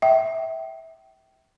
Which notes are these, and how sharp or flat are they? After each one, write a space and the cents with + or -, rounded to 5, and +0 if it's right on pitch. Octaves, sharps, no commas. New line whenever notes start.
E5 -20 G5 -25